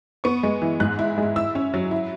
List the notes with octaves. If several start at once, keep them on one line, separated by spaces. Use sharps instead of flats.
B3 C#6
G#3
E3
G#2 F#6
E4
G#3
E4 E6
C#4
F#3
E4